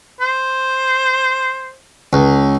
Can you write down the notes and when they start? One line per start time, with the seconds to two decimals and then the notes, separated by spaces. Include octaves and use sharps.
0.21 C5
2.13 C#2